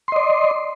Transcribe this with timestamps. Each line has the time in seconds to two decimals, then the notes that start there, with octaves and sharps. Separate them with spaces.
0.08 C6
0.12 D#5
0.16 D5